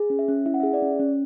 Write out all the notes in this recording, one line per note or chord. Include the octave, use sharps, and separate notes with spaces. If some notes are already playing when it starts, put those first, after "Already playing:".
Already playing: G#4
C#4
E5
C#4
E4 E5
F#5
E5
G#4
D5
C#4
C#4